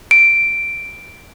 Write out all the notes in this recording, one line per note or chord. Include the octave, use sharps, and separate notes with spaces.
D7